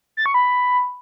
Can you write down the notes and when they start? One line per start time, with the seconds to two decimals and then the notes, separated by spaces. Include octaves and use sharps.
0.17 A6
0.26 C#6
0.34 B5